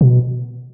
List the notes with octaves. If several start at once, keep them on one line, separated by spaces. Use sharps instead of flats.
B2